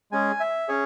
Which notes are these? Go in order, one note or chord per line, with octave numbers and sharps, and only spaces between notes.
G#3 C#4 G#4 G#5
E5
C#4 G#4 C#5